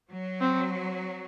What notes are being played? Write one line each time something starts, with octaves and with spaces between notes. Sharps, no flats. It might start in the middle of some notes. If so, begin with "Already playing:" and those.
F#3
C4